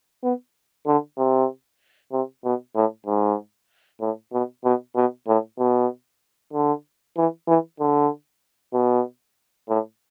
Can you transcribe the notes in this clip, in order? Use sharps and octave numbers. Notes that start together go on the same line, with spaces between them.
B3
D3
C3
C3
B2
A2
G#2
A2
B2
B2
B2
A2
B2
D3
E3
E3
D3
B2
A2